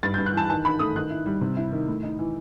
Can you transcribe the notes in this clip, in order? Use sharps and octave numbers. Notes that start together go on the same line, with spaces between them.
G2 A6
G6
G2
F#6
E3 A5
D#3 A5
D#3 B5
A3 D#6
D#3 F#6
E4
G3
C3
E4
D#3
A2
D#4
E3